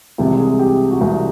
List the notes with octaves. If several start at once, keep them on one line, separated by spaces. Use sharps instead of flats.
C2 C3 E3 G#3 G4
G#4
G4
F#4
C2 C3 E3 G#3 G4